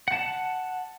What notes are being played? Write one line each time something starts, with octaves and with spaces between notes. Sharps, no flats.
F#5 A5